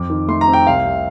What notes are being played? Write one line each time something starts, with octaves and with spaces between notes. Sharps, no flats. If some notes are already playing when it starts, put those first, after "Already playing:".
Already playing: F2 D6
D#3
A3 C6
A#5
C4
G5
C2 F5
C3